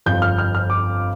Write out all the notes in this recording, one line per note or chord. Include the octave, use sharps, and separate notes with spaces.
G1 F2 F3 G6
F6
F6
F6
D6